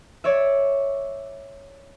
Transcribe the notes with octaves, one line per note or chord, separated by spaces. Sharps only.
C#5 D5 E5